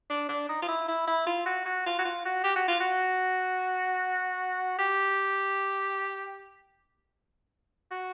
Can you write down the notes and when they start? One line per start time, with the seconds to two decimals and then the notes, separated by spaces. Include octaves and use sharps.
0.10 D4
0.29 D4
0.49 D#4
0.62 F4
0.68 E4
0.88 E4
1.07 E4
1.26 F4
1.46 F#4
1.66 F#4
1.86 F4
1.99 F#4
2.05 F4
2.25 F#4
2.44 G4
2.56 F#4
2.68 F4
2.80 F#4
4.79 G4
7.91 F#4